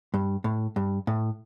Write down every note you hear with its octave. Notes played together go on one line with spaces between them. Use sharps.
G2
A2
G2
A2